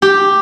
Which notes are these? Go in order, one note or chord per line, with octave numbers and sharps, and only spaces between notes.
G4